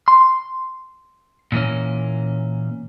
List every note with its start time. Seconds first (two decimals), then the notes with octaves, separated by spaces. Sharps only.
0.08 C6
1.52 A#2 E3 A#3 C#4